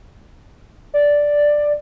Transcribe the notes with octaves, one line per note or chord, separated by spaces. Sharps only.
D5